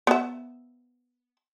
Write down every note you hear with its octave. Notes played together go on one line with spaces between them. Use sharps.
B3 E5